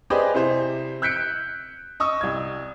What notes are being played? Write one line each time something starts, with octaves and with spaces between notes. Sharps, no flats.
G4 G#4 B4 C5 D5 D#5
C3 E4 C5
E6 F#6 G6 B6 C#7 D7
D#5 C#6 D#6 E6
C2 G#6